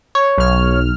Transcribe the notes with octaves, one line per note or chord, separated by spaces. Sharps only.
C#5
B1 F6